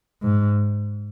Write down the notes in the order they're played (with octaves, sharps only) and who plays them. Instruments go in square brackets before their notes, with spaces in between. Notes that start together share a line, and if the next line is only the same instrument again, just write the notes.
[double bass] G#2